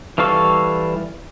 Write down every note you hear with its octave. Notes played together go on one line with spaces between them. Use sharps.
E3 G3 A4 F5 C#6